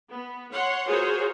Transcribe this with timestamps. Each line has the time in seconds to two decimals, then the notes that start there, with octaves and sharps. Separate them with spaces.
0.10 B3
0.52 C#5 F#5 C6
0.87 F4 F#4 G#4 A#4 C5 C#5